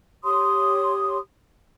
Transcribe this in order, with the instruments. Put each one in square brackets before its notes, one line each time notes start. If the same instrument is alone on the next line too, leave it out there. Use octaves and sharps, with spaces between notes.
[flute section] G4 C#5 C6 D#6